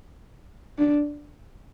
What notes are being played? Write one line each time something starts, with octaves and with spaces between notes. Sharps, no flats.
D4